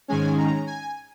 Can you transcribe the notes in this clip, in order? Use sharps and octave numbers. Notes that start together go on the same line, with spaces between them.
G#2 D#3 G#3 C#4 G#5
A#5
G#5